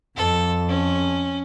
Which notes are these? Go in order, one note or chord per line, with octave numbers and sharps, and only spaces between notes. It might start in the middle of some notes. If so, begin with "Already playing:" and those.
F2 A4
C#4